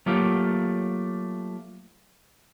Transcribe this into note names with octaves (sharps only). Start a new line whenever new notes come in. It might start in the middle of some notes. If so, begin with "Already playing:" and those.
F#3 A3 A#3 F4 G4